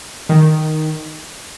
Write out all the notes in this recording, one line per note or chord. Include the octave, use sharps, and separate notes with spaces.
D#3